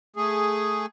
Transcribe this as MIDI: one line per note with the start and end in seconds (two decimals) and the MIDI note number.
0.16 0.86 57
0.16 0.86 68